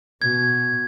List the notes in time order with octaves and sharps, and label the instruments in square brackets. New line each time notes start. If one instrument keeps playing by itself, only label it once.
[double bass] B2 [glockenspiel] G#6